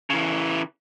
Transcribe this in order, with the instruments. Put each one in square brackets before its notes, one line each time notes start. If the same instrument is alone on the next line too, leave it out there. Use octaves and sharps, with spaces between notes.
[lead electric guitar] C#3 E3